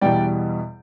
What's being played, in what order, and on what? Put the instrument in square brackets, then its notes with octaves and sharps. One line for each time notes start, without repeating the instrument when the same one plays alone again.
[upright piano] E2 B2 G3 D5 G5